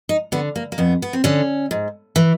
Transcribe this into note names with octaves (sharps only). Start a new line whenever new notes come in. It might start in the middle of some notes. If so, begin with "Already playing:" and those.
D#4
D3 B3
A#3
A#3
F2 B3
B3
C4
D3 C#4
G#2
E3